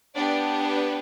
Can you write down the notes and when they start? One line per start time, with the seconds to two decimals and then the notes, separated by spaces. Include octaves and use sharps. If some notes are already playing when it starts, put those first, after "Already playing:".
0.14 B3 D4 G4 D5
0.63 B4